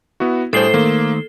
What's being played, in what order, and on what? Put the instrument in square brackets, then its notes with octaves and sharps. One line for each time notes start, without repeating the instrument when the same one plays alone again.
[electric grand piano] B3 E4 F#4
[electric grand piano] A2 C5 [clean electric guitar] G3 D4 G#4 [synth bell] A4 C7 G7
[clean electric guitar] D#3 A3 C5 [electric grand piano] A#3